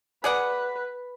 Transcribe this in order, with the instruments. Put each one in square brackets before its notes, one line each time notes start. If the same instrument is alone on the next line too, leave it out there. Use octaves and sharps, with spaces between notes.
[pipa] G#4 D5 F#5 [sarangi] B4